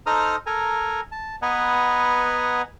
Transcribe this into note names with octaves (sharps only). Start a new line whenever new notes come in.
D#4 A4 C5 A#5 D#6 F6
A4 A#4 G#5 A#5
A5
B3 B4 D#5 F#5 G#5 A#5